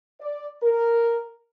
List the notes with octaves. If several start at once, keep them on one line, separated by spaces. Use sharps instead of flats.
D5
A#4